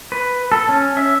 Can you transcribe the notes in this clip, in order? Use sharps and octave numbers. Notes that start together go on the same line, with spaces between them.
B4
A4
C#4
E5